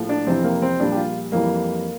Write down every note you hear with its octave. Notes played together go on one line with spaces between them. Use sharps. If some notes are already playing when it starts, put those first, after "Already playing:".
Already playing: A#1 A2 F3
D4
F2 C3 E3 C4
A#3
C4
A#1 A#2 G3 D4
G4
F4
F2 E3 G3 A#3